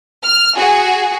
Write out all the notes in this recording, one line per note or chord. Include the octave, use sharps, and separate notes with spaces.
F6
F#4 G#4